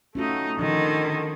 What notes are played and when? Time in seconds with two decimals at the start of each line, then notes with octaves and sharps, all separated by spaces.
0.15 A3 C#4 D#4 F4 F#4
0.59 D3 D#3 F3